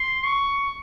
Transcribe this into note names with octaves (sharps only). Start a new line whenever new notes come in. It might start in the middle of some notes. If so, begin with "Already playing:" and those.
Already playing: C6
C#6